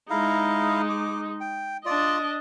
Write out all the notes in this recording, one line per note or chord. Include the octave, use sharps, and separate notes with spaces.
G#3 D#4 E4 F5 A#5
D6
G5
D4 F4 D5 D#5